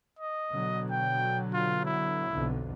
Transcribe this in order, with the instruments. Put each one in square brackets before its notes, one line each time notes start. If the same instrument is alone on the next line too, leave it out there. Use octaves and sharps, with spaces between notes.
[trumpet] D#5
[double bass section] B2 D3 F#3
[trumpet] G5
F4
E4
[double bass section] B1 F2 D3